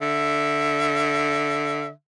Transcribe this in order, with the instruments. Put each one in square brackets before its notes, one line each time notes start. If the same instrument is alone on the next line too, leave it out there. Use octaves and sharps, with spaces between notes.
[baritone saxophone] D3 [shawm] E5